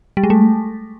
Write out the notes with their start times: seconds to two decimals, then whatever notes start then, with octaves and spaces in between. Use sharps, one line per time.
0.17 G3
0.24 G#3
0.30 A3